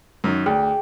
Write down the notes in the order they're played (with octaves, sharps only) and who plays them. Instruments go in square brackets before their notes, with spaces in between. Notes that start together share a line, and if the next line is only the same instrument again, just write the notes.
[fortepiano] F#2 D#3
[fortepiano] D2 [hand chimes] G#4 G5